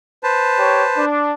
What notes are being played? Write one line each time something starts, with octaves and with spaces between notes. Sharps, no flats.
B4 C5 A5
G4 C#5
D4